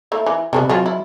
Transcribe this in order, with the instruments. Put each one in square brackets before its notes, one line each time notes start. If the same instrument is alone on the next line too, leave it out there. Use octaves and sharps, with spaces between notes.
[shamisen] A3 A#3 E4
E3
[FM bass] C3 [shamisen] G3 A3 B3
[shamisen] F3 C4 F4 [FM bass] F#3
[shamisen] E4